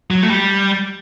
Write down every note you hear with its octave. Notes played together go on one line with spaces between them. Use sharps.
F#3
A3
G3